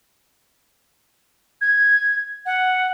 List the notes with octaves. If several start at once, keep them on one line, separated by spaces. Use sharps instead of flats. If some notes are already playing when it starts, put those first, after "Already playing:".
G#6
F#5